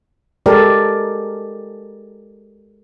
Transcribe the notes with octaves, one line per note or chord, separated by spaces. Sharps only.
G#3 G4 A4 A#4 D5